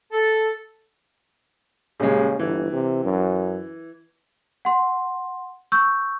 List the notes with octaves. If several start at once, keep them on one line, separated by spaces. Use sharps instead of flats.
A4
D#1 C#3 G#3
G1 E3
C3
F#2
F#5 C6
C#6 E6 G6